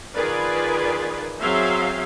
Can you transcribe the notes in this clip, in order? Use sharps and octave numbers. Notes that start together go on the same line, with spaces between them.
D#3 F4 G#4 B4 D5
F#3 C4 G#4 C5 E5 F5